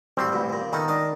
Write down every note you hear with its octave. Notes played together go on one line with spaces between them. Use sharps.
A1 G3 C4 F#4 C5
A1 D2 B2
D#2 A#2
D#3 B3 D#4 A4
D4 A#4 D#5